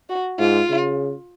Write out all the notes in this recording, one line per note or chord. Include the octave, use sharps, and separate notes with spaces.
F#4
G#2 F4
C#3